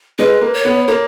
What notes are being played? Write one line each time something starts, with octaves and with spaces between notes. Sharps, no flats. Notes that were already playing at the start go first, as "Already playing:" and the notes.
G#3 B4
A#3
C#5
B3
A#3 C#5